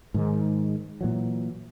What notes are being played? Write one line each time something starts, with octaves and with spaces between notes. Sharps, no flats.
G#2 D#3 G#3
A#2 E3 F#3